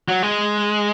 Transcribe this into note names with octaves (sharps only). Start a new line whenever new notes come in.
F#3
G#3